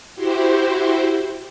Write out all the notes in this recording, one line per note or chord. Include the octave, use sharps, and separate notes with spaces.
E4 F#4 G4 C5